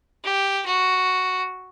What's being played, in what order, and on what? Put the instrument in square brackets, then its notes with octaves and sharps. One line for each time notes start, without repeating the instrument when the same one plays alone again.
[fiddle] G4
F#4